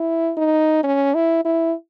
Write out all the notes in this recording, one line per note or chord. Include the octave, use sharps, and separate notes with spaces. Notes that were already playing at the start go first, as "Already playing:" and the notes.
Already playing: E4
D#4
C#4
E4
E4